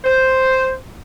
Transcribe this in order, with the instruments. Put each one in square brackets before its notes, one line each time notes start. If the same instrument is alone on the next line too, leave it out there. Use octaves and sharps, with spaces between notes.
[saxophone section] C5